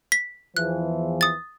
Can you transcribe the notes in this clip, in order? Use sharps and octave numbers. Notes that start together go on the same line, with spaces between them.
B6
E2 E3 F3 F#6
D#6 A6